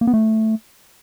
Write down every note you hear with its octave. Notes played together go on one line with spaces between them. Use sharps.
A#3
B3
A3